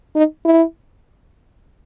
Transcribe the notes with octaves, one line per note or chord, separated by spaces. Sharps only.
D#4
E4